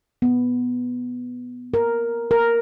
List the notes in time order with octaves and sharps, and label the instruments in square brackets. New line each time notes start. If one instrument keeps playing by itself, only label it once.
[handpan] B3
A#4
A#4